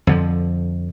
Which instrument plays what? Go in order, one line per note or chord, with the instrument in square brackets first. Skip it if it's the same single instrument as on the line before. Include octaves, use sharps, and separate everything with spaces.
[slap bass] F2 D3 F3